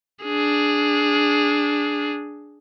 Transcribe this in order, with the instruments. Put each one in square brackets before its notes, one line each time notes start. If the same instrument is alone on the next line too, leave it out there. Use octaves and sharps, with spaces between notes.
[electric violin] D4 G#4